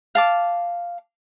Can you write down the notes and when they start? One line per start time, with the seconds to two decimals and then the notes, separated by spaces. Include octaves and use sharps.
0.15 F5 A5 D6